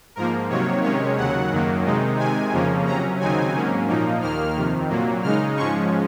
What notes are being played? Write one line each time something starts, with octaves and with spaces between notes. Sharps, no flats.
G#2 F3 A#3 A#4
C3 D#3 F#3 A#3 C#5
C3 D#3 G#3 C#4 C#5
D#2 C#3 F#3 F#5
F#2 D#3 F#3 A#3
C3 D#3 G#3 D#4
C3 D#3 G#3 G#5
F2 C#3 F3 A#3 C#4
C3 F#3 C#4 A#5
D#2 C#3 F#3 C4 D#4 G#5
G#2 F#3 A#3 C#4
A#2 F3 A#3 D#4
D#2 D#3 A#3 F6
F2 C3 D#3
A#2 F#3 A#3
C#3 G#3 D#4 F6
G#2 F3 G#3 C#4 C#6